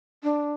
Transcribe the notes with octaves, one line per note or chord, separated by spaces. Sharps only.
D4